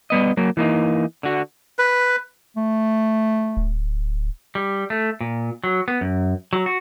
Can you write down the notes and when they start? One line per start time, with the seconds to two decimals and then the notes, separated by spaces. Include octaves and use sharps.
0.10 G3 B3 D#5
0.37 F#3 A#3
0.57 E3 A#3 D#4
1.23 D3 F#4
1.79 B4
2.57 A3
3.57 D1
4.55 G3
4.90 A3
5.21 A#2
5.64 F#3
5.88 B3
6.01 F#2
6.53 F#3
6.66 F#4